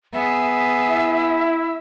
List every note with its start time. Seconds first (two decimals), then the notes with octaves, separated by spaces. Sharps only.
0.13 B3 G#4 E5
0.89 E4